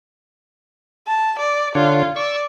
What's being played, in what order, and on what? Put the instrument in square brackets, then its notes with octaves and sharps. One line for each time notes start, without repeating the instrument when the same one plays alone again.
[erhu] A5
D5
[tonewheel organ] D3 D4 C#5 [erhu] F4
[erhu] D5 [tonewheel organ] C#6 E6